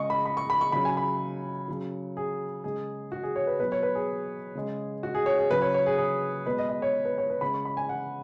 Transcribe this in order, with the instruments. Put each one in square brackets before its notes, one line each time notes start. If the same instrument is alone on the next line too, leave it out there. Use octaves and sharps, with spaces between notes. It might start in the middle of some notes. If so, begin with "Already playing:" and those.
Already playing: [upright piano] C#3 G#3 D#5 C#6
B5
B5
C#6
B5
C#6
C#3 F#3 B5
G#5
B5
C#3 F#3
G#4
C#3 G#3 G#4
F#4
G#4
C#5
B4
B2 F#3 B4
C#5
B4
G#4
C#3 G#3
F#4
G#4
C#5
G#4
C#3 F#3 B4
C#5
C#5
G#4
G#4
B2 G#3 B4
D#5
D#5
C#5
B4
C#5
B4
C#3 G#3 B5
C#6
B5
G#5
F#5